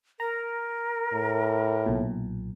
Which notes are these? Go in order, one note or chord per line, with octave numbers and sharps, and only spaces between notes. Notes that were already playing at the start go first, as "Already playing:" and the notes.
A#4 A#5
A2
B1 A#2